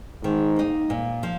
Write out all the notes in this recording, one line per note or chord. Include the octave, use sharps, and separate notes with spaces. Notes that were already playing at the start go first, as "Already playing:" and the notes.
G#2 D#3
A#3 D#4
A#2
F3